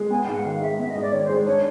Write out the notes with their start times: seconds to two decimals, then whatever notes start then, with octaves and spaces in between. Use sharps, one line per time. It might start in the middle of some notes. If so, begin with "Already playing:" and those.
Already playing: G#3
0.10 B3 G#5
0.22 G5
0.27 G#2 F5
0.33 F#5
0.44 D#3 F5
0.61 G#3 E5
0.78 B3 E5
0.89 D#5
0.95 G#2
1.01 D5
1.12 D#3 C#5
1.24 C5
1.29 G#3
1.46 D4 C#5